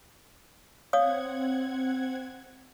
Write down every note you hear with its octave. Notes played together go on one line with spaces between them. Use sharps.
C4 C#5 F5 F#5 D#6 G#6